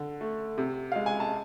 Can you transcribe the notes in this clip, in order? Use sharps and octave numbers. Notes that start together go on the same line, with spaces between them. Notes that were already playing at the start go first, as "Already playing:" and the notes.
Already playing: D3
A3
C3
G#3 F5
G#5
A5